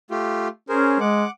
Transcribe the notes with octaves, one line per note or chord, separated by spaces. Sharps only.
A3 F4 G4
C#4 G#4 A#4 C5
G#3 F#5 D6